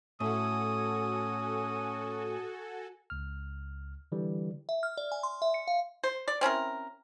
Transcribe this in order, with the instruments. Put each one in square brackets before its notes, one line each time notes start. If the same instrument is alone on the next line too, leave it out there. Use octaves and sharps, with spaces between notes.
[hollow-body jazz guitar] A2 [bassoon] C#4 [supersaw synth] F#4 A4 G#5 [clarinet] D#6
[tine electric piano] C#2 F6
D3 E3 G3
[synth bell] E5
F6
D5
G#5
C6
E5
C#7
F5
[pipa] C5
D5
C4 C#4 E4 A#4